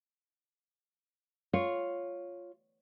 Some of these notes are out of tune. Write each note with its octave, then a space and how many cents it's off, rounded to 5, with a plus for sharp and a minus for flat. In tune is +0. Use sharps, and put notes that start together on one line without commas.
F4 +0 C#5 +0